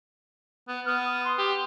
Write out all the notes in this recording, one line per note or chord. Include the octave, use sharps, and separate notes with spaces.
B3
B3 F6
D#6
C6
G4